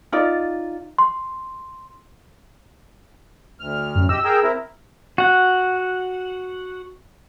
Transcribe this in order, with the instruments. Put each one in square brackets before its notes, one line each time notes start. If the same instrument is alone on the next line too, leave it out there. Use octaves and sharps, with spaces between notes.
[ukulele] D#4 F4 D5
[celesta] C6
[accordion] D2 F6
[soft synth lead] F#2
[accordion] G4 D#5 [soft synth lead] E6
[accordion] G#4 A#4 G5
C4 E4 A#4
[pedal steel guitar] F#4 F#5